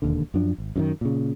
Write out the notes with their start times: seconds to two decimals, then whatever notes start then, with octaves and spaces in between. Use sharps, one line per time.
0.02 E1 D#2 D3
0.34 F#2 F3 D4
0.58 G#1
0.76 F#2 D3 D#3
1.01 A#2 C#3